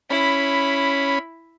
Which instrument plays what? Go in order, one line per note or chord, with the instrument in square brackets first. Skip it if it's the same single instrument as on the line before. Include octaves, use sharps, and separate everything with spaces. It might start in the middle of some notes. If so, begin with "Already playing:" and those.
[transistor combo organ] C#4 B5 [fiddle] E4